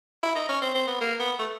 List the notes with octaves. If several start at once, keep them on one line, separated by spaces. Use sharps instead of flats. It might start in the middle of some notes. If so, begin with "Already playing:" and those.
E4
D#4
C#4
C4
C4
B3
A#3
B3
A3